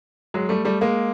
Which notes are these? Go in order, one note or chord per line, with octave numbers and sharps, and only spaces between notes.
F#3 G#3
G3 A3
G3 A3
G#3 A#3